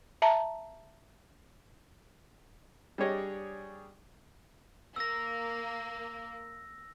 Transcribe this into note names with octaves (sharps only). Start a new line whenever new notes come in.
E5 A5 A#5
G3 D4 G#4 C#5 D#5
A#3 E6 A#6